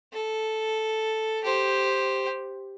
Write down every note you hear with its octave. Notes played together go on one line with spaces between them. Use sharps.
A4
G4 C5